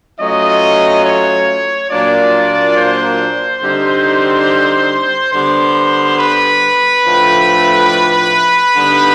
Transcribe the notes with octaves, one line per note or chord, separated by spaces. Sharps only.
F#3 A3 C#4 F4 D#5
C#5
A#2 F#3 A#3 D4 F4 D5
C5
D3 G3 C4 D#4
D3 G3 B3 C5
B4
A2 F3 A3 D4
D3 G3 B3 D#4